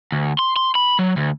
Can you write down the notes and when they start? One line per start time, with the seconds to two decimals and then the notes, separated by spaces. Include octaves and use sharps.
0.12 D2
0.39 C6
0.56 C6
0.75 B5
0.99 F#3
1.17 D2